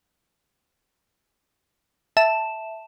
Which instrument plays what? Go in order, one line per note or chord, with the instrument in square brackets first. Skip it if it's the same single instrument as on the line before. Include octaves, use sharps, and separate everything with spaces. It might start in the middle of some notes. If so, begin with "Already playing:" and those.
[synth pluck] E5 A5 E7